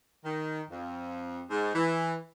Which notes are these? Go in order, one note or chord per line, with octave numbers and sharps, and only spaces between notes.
D#3
F2
G#2
E3